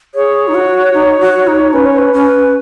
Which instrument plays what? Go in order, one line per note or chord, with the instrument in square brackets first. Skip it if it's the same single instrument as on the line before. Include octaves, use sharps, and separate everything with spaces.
[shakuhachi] G#4 [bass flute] C#5
[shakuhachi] D#4
F#4
D#4
F#4
D#4
[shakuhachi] C#4 [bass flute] B4
[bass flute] C#5
B4
[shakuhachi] C#4